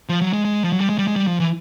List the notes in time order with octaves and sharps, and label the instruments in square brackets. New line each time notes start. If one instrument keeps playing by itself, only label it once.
[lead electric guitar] F3
F#3
G#3
G#3
F3
F#3
G3
G#3
G3
G#3
G3
F3
E3